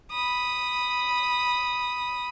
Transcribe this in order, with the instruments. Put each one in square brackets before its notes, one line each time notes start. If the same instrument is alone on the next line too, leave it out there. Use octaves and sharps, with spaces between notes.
[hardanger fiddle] B5 D#6